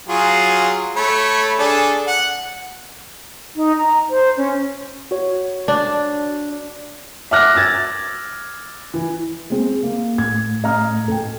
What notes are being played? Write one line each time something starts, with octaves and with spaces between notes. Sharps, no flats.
F#3 F4 G#4
A3 C#5 B5
D4 G#4 A4
F#5
D#4
A#5
C5
C#4
F#4 C#5
D4
E5 F#5 D6 F6 F#6 A#6
E6 G#6 A6
E3
G#3 C4 G#4
A#3
A2 G#6
D#5 A#5 F6
A4 G5